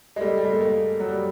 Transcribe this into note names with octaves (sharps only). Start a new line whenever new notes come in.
G#3
G3 A3
G3
G#3
A3
G#3 A#3
F#3
G3